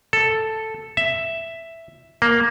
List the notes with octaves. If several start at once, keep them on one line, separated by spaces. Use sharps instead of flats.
A4
E5
A#3